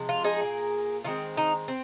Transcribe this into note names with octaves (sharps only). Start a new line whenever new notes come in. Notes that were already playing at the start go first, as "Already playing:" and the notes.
Already playing: C3 F3 G#3
F4
D#4 G#4
A#2 A#3
D#3 G#3 C4 F4
D#4
C4